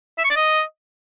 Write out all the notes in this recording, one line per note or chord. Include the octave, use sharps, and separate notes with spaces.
E5
C#6
D5
D#5